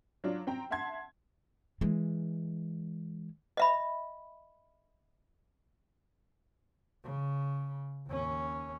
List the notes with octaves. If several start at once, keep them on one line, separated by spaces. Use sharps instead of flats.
F#3 D4 F4
C4 G5 A#5
E5 F#5 A5 C6 G#6
E3 G#3
D#5 E5 B5
C#3
D#2 C#4